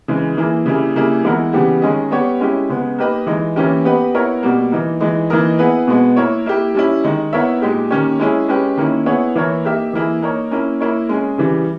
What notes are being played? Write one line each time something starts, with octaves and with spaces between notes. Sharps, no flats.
C#3 E3 G#3
E3 A#3 E4 G#4
C#3 G3 A#3 E4 G#4
C#3 G3 A#3 E4 G#4
E3 G#3 B3 E4 A#4
C#3 E3 G3 B3 G4
D#3 G#3 C#4 G#4 D#5
G3 B3 G4 C#5
G#3 C#4 E4 G4
C#3 G#3 B3
A#3 D#4 G4 B4 D#5
E3 G#3 D#4
E3 A#3 C#4 E4 G4
B3 G4 B4 D#5
B3 E4 A#4 C#5
B2 G3 A#3
E3 A#3 D#4
E3 G#3 D#4
E3 A#3 D#4 A#4 D#5
B3 E4 G#4 B4
B2 G#3 B3
A#3 E4 A#4 C#5
A#3 E4 G4
G3 C#4 E4
D#3 G#3 D#4
B3 E4 A#4 C#5 E5
A#2 G#3 D#4 G4
D#3 A#3 C#4 G4 C#5
G#3 C#4 E4 G#4
G#3 C#4 G4 B4
D#3 A#3 C#4 E4
B3 E4 G#4 C#5
E3 A#3 E4 A#4 C#5
A#3 D#4 G4 A#4 E5
E3 A#3 E4 G#4
A#3 D#4 A#4 C#5
A#3 C#4 E4 A#4
A#3 E4 A#4 C#5
G#3 C#4 G#4 D#5
C#3 E3 G3